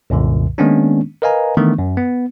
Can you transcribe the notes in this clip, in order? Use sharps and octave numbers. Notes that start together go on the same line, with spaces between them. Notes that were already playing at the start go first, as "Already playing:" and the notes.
C2 F#2 A#2 D3
D#3 G#3 A#3 B3 C#4 D4
A#4 B4 D#5 F5 G#5 A#5
D#3 E3 A3 B3 D4
F#2
B3